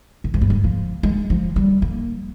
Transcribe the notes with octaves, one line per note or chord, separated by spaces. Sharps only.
A#2
G#2
G2
G#2
F3
G#3
F3
G3
A#3